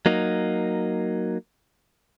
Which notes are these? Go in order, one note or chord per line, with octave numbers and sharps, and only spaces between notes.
F#3 A#3 D#4